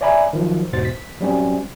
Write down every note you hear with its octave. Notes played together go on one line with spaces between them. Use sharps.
C#5 D5 E5 G#5 A#5 B5
D#3 F3 F#3
E2 G#2 B2 C5 A6
B6
F#3 G3 C4 C#4